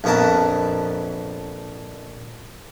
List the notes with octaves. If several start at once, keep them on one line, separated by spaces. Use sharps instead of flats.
A#1 F2 B3 A#4 A5